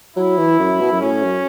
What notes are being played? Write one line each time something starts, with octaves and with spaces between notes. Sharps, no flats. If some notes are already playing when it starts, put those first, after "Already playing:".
F#3 E4
E3
F#2
B2
F#2
A2 C#4
F#2